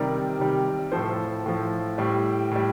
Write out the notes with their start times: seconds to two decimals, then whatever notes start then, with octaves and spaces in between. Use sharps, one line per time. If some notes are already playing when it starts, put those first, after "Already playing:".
Already playing: C3 D#3 G3 A#4 D5
0.39 C3 D#3 G3
0.92 A2 F3 A4 C5
1.46 A2 F3
1.98 A2 G3
2.51 A2 G3